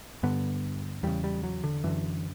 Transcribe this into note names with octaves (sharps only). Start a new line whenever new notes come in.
G2 D3 B3
E2 C#3 G3
G3
F#3
D3
F#2 D3 E3